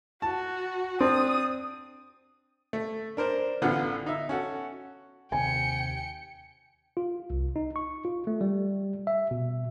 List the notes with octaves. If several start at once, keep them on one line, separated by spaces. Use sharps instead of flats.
F#4 A5
C4 D4 D#6
A3
D4 A#4 C5
A1 D3 B3 F4 F#5
D#4 E5
C#4 F#4 A4
D#2 C3 G5 G#5 C#7
F4
C2
D#4
C#6
F4
A3
G3
E5
B2